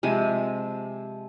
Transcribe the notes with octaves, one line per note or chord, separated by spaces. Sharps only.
C3 F3 G#3 G#5